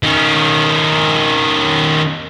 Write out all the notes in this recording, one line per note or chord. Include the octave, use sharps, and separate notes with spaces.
D#3 C#4